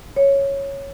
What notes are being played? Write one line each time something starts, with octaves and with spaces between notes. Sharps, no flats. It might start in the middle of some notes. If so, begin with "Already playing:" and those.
C#5